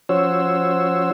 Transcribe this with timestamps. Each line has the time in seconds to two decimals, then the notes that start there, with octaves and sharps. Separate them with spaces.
0.09 F3 C#4 F#4 C5 C#5 E6